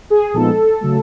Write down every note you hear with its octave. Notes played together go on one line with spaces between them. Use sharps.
G#4
A#2 F3 G#3 B3 D#4 A4
C#3 F#3 A3